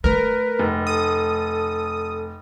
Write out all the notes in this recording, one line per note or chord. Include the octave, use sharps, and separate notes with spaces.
A3 A#4 B4
F1
A4 D#6